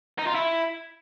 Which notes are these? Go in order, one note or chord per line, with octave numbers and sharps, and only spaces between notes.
D#4
F4
E4